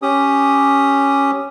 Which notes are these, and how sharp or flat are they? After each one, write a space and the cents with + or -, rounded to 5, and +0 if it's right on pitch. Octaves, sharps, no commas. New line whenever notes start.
C#4 +0 G4 +0 D#6 +0